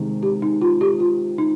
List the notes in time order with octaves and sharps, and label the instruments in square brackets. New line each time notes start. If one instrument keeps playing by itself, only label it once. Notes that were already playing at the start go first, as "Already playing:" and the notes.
Already playing: [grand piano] C3 D#3 G#3
[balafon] G4
D#4
F4
G4
F4
D#4